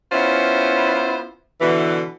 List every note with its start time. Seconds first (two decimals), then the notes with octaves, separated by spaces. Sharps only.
0.12 B3 C#4 E4 F4 C5
1.61 B2 D3 E3